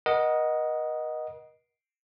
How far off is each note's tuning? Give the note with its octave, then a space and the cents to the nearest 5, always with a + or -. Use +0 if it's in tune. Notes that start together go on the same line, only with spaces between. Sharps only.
A#4 +45 D#5 +0 F#5 +5